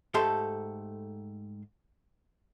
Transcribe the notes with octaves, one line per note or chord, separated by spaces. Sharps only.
G#2 A3 G4 A4 C6